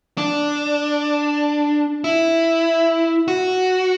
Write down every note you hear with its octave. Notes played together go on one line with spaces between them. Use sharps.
D4
E4
F#4